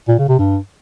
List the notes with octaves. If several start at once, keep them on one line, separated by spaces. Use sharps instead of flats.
A#2
C#3
C3
G2